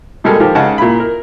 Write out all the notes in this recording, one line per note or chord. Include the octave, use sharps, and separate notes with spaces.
B2 G3 G#3 A#3 A4 A#4
D#3 F3 G4 A#4
C#3 G#3 D#4 F#5 A5
A#2 E4 B5
A#4